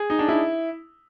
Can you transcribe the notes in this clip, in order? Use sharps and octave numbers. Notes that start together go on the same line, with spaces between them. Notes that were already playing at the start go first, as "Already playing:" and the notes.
Already playing: G#4
D#4
D4
E4